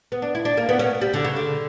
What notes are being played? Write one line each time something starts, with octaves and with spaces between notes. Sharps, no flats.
B3
D4
E4
D4
A#3
B3
C#4
G3
D3
C#3
D3